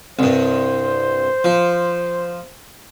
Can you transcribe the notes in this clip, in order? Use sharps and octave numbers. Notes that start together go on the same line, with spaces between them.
C2 G2 C5
F3